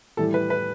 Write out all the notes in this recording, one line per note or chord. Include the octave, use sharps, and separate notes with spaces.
A2 E3 G3 A4
B4
B4